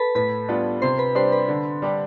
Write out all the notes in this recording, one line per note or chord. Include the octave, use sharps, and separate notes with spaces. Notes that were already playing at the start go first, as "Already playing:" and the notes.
Already playing: A4 B4 A5 B5
A2 B4 B5
G3 B3 D4 F4
C3 C5 C6
B4 B5
G3 D4 G4 C5 C6
B4 B5
D3
G3 D4 G4